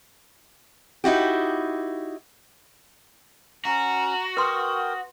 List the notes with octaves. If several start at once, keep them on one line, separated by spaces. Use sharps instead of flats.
D#4 E4 F#4 G4
C#4 F#4 A#5
A#4 B4 G5 C6 D#6